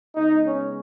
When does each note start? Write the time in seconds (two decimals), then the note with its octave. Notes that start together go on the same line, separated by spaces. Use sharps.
0.15 C#3 G#3 B3 D#4
0.46 C#4